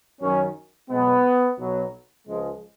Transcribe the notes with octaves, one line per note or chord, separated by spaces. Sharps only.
F#2 D#3 F#3 C#4
B1 B2 G#3 B3
B1 B2 F#3
C#2 C#3 F3 G#3